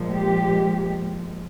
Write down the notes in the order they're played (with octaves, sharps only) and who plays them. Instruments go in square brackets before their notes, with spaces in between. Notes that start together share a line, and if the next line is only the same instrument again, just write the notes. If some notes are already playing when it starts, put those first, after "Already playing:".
Already playing: [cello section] A#2 F3 G#3
G4